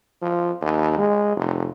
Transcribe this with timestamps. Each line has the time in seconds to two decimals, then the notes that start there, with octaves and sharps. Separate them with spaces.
0.22 F3
0.61 D#2
0.97 G#3
1.36 F1